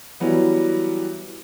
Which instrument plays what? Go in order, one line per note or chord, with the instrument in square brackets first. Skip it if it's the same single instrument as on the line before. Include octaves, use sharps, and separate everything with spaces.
[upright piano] E3 F#3 G3 B3